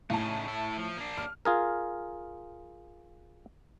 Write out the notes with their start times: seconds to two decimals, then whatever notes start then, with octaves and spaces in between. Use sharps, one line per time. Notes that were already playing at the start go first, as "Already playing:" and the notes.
0.10 A2 C#3 D#4 A5
0.48 E4 A4
0.77 F3
0.97 A#3 D4
1.18 F6
1.45 F4 G#4 A#4